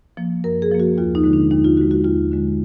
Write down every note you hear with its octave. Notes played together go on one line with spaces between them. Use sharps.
F3 A#3
F#2 A#4
G#4
F3 A#3
F#4
D#2 F4
D#4
D3 G#3
D4
D#2 D#4
F4
D3 G#3 F#4
F#4
D#2 F4
D3 G#3